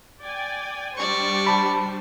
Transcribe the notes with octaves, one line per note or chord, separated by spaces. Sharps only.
D5 G5 G#5
G3 D4 C5 D5 C#6
A5 B5